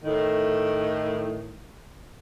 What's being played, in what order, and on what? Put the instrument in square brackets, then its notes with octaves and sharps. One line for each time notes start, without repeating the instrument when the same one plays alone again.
[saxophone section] A2 D#3